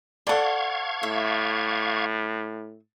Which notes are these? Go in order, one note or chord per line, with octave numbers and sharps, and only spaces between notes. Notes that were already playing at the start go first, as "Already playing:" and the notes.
A4 C5 D5 F5 F#5 C#6 G#6
A2 E5